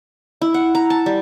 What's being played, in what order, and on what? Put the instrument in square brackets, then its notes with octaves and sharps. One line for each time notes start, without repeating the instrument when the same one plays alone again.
[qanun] E4
F#5
A#5
A5
G3